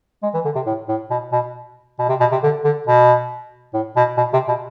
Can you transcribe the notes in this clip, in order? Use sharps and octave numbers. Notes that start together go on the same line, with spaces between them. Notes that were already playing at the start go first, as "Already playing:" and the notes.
G#3
E3
D3
C3
A2
A2
B2
B2
B2
C3
B2
C3
D3
D3
B2
A2
B2
B2
C3
B2